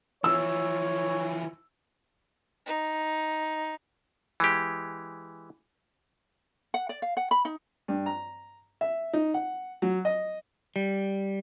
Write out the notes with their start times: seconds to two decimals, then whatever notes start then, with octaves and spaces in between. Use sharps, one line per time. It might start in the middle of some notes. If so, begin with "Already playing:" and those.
0.24 E3 F3 C#5 E6
2.66 D#4
4.40 E3 G#3 G4
6.74 F#5
6.89 D5
7.02 F5
7.17 F#5
7.31 B5
7.45 D#4
7.88 G2
8.06 A#5
8.81 E5
9.13 D#4
9.34 F#5
9.82 F#3
10.05 D#5
10.76 G3